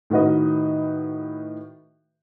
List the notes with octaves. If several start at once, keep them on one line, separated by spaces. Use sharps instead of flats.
A2 D#3 F#4 B4 D#5